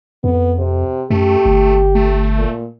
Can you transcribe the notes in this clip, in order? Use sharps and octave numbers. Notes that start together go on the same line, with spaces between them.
F2 B3
C3
F#2 A3 G4
G1
A3
A#2